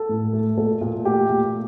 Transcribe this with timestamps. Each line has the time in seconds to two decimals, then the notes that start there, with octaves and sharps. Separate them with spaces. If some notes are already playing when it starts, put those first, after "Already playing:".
Already playing: A4
0.09 A2
0.33 A3
0.57 A#2 A4
0.81 A#2
1.05 A3 G4
1.29 A#2